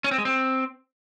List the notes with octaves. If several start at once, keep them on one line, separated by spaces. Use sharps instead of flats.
C#4
C4
G#3
C4